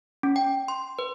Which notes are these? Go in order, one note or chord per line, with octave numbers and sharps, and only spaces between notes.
C#4
G5
C6
B4